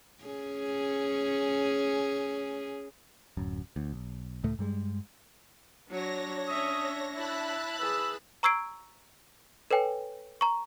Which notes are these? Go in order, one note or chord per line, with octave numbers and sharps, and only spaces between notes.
C#4 G#4
D1 F#2
D2
B1
C#2 A2 A3
G2 G3 G#3
F#3 D4 C#5 A#6
C#4 E5 D#6
E4 E5 A5 B5 F#6
G#4 B4 E6
A#5 C#6 E6 G#6 C7 D7
A4 B4 C#5 G5 G#5
A#5 C#6